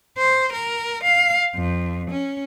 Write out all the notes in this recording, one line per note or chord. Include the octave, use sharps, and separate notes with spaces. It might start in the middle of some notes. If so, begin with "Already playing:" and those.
C5
A#4
F5
F2
C#4